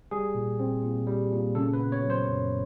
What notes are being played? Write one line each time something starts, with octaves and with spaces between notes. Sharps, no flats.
G3 G#4
A#2
C4
A#2
G3
A#2
C#3 A4
B4
B3
C#5
F#3
C5
F#2